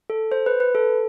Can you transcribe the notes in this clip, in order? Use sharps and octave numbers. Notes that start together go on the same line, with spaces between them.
A4
C5
B4
B4
A4